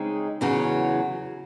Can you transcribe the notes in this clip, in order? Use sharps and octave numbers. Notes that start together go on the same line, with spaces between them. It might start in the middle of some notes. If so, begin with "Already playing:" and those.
Already playing: C#3 G#3 C4 D#4
E2 C#3 F#3